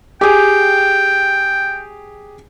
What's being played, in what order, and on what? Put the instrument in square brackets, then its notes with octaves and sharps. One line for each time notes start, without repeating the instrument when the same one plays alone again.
[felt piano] G4 G#4 [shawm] G5